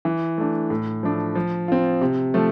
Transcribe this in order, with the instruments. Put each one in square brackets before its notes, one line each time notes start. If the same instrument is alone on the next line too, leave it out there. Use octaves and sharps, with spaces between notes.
[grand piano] E3
A3 D4
A2
F3 A3 D4
F3
C4 F4
C3
F3 A3